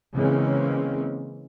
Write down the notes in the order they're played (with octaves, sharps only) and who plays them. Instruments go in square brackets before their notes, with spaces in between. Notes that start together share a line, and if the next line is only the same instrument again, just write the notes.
[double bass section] C#3 E3 G#3 A#3 C4 C#4